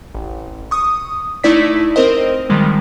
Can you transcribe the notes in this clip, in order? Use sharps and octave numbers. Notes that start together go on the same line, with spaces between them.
A1
C#6 D#6
A3 D#4 E4 D5 B6
C4 A#4 C5 D#5
D#3 F3 G3 G#3